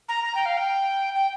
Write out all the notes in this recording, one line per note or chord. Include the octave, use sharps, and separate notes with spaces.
A#5
A#5
G5
F5
G5
G5